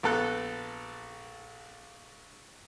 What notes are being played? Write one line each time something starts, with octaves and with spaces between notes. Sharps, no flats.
A#1 B3 A4 F#6